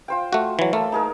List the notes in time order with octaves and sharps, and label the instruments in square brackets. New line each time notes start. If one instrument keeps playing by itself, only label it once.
[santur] F4 C5 G5
[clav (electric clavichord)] A3 F#4
E3 F#3
[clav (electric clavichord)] A3 [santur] A#3 A5 E6
[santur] D#4 G#4 A#4